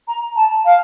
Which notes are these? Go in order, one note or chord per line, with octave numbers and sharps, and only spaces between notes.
A#5
A5
F5